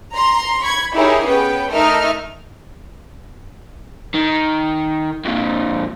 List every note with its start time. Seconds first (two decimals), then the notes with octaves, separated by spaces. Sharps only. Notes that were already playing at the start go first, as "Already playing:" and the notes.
0.15 A#5 C6
0.63 B5 C#6 G#6
0.94 D#4 E4 G4 G#4 A#4 C#5
1.24 B3 C#4 B4 G5
1.71 A3 D#4 A#4 E5 F6
4.15 D#3
5.25 F2 A#2